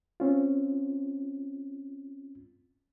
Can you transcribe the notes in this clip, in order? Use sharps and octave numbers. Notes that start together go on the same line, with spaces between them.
C4 C#4 F4